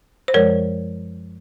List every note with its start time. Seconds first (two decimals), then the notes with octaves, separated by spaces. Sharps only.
0.28 C5
0.34 F#2 F3 G#3 A#4 C#5